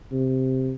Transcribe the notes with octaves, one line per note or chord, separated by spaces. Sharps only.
C3